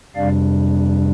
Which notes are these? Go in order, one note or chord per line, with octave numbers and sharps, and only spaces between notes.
F2 C3 G3 D4 D5 F5